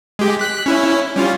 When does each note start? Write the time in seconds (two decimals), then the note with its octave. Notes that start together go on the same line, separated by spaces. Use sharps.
0.19 G#3 G4
0.39 F#6 B6
0.66 C#4 E4
1.16 G3 C#4 F4